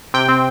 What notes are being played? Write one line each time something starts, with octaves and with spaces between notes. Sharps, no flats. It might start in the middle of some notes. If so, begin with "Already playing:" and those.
C3 G5
C4